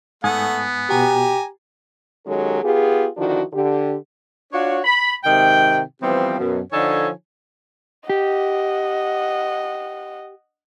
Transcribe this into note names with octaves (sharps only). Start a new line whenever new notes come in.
G#2 A3 B3 F#5 G#5 D#6
B2 F#4 G4 G#5 A#5
D#3 F#3 G#3 C#4 G4 A4
B3 F4 G4 G#4
D3 D#3 F3 D4 E4 F#4
D3 G4
D4 F4 F#4 C#5
B5
G#2 C3 D#3 G5
E3 F3 G3 B3 C4
F#2 B2
D3 F3 D#4 A4 C#5 G#5
G4 D#5 F#5